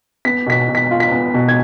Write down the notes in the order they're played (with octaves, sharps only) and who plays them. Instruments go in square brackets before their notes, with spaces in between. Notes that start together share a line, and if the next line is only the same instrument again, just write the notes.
[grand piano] B3 [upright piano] B6
[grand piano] B2 [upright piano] B6
[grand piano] B2
[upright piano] B6
[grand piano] F4
[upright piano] B6
[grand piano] B3
B2
[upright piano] G#6